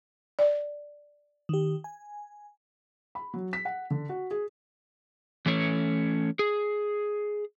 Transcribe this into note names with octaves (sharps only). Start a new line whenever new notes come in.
D5
D#3 G4
G#5
B5
F#3
B6
F#5
D3
F#4
G#4
E3 A3 C#4 C#5
G#4